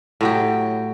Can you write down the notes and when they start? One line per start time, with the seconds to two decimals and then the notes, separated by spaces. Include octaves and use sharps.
0.21 A2 F#3 G4